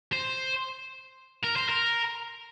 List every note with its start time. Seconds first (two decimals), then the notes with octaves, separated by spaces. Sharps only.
0.13 C5
1.44 A#4
1.56 C5
1.69 A#4